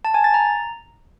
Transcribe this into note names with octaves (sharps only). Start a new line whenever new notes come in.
A5
G#5
A6
A#5